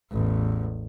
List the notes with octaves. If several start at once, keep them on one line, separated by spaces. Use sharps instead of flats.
A1 E2